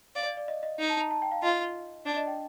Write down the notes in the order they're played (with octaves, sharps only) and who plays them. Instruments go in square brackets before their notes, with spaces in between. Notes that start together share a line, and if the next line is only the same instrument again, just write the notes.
[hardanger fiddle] D5 [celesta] F5
[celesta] D5
D5
D#5
D#5
[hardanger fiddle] D#4
[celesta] A5
A#5
A5
G5
F5
[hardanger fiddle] F4 [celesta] D#5
[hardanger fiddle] D4 [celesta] D5
[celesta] D#5
G5